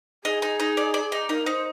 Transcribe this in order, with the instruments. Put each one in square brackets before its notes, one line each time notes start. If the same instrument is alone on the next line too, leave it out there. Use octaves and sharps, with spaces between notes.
[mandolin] D#4 [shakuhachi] G#4
[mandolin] D#4
D#4
D5
D5
D#4
[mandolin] D#4 [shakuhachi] A#4
[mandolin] D#4 [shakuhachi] C5